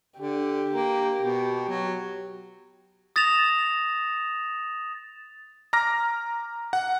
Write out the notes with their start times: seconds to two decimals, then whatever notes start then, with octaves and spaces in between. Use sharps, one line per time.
0.19 D3 G4
0.73 A#3
1.21 B2
1.68 F#3
3.16 D#6 A6 A#6 E7 F7
5.73 A#5 D6 F6 A#6
6.73 F#5